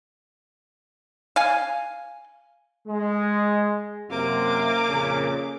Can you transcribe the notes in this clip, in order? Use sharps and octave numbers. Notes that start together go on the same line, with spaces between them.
F5 G#5
G#3
F#2 C3 A#3 D6
F2 A#2 C#3